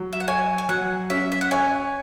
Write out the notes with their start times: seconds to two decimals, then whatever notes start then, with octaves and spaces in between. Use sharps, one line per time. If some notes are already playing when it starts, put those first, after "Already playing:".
Already playing: F#3
0.13 E5
0.20 F#5
0.28 C#5 G#5
0.58 G#5
0.69 F#3 F#5
1.10 C#4 E5
1.32 E5
1.41 F#5
1.51 C#5 G#5